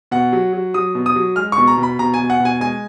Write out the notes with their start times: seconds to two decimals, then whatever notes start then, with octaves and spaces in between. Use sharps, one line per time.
0.11 B2 F#5
0.33 F#3
0.53 F#3
0.74 F#3 D#6
0.95 B2
1.06 D#6
1.16 F#3
1.36 G#3 F6
1.52 C#6
1.58 B2
1.67 A#5
1.77 B2
1.83 B5
1.99 B2 A#5
2.14 G#5
2.19 B2
2.30 F#5
2.40 B2
2.45 G#5
2.60 G#3 G#5